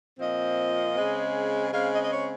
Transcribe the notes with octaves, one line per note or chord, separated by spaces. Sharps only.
A#2 F3 C4 D#5
C#3 G#3 C4
C#3 G#3 C4 F5
D#5
D#5
C#5